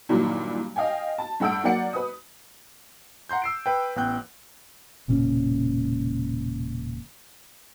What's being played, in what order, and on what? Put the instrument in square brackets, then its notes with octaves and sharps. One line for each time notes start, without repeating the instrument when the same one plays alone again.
[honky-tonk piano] G2 A#2 D#3 E3 F#3 G3
D#5 F5 G5 G#5
A5
G2 A3 F#5 E6 G6 D7
F#3 A#3 D5 F#5 C#7
B4 D#6
[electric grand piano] F#5 A#5 C6 G6
E6 C7 D7
B4 G5
A1 B3 G5 F#6 G6
[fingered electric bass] E1 A#2 C#3 C#4